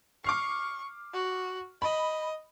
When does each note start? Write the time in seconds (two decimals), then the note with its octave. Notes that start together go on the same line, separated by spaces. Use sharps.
0.24 C#6 D6 F6 C7
1.13 F#4
1.82 D#5 B5